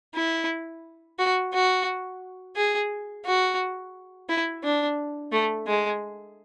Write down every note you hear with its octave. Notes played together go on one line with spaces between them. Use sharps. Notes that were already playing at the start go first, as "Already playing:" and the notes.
E4
F#4
F#4
G#4
F#4
E4
D4
A3
G#3